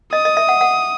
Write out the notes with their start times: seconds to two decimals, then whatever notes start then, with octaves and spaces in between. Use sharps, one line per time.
0.13 D#5 D#6
0.25 D#5
0.37 E5
0.49 F#5
0.61 F#5